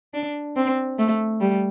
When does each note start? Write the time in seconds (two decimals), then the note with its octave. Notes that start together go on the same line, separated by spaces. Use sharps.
0.14 D4
0.56 C4
0.99 A3
1.41 G3